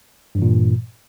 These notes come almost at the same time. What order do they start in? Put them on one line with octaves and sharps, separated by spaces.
G2 E3 A#2